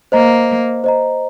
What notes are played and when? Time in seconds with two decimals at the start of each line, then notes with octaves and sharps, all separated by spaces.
0.12 A#3 C5 D#5 A#5
0.84 C5 D#5 A#5